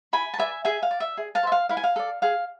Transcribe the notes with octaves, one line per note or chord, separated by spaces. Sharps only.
E4 G#5 B5
A5
B4 D5 E5 G#5
G#4 E5 G#5
F5
D5
E5
G#4
F5 A5
C5 E5
F5
E4 F5
G#5
F5
A4 D5
G#4 F5